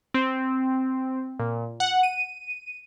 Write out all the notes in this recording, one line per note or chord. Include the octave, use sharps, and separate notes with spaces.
C4
A#2
F#5
D#7